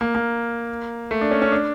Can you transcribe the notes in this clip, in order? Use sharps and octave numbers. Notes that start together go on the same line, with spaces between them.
A#3
A#3
A3
D4
C#4
C#4
D4